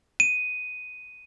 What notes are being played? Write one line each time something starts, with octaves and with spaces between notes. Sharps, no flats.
D#7